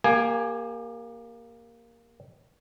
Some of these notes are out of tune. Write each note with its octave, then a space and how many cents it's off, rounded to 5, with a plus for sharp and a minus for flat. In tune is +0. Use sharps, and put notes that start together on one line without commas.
A#3 +0 G4 +35 G#5 +0